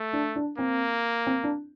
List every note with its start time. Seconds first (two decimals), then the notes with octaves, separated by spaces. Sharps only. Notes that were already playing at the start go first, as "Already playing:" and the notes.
Already playing: A3
0.13 D4
0.36 D4
0.58 A#3 C4
1.27 C4
1.44 D4